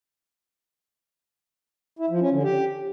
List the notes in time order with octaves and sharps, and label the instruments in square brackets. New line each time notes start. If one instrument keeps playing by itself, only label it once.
[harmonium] E4
F3
C#4
D3
G4